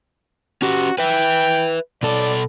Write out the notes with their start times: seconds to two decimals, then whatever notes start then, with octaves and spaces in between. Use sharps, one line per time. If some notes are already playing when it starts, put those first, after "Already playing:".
0.62 C#4 F#4 G4
0.99 B4 E5 G5
2.03 B2 A4 D5